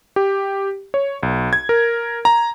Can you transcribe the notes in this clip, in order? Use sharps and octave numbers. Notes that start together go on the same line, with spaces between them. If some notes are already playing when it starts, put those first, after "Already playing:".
G4
C#5
B1
G#6
A#4
A#5